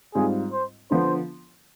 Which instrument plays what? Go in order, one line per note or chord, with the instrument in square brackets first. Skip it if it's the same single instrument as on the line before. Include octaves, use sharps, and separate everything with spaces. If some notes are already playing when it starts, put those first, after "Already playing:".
[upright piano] G#2 G3 C4 F4 [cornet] G#4
[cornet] C5
[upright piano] D3 F3 B3 [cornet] C5